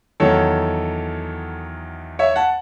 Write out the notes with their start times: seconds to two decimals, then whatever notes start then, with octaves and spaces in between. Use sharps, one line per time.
0.20 E2 D#3 F#3 A4 C#5
2.19 C#5 E5
2.36 F#5 A5